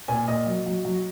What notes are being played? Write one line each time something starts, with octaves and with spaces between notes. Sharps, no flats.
A#2 G#5
A#2 D#5
F#3
F#3
F#3